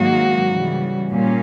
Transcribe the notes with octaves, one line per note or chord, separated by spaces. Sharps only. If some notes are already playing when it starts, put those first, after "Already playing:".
Already playing: G#2 D#3 F#3 A#3 F#4
C#3 E3 G3
A#2 G3 A#3 C#4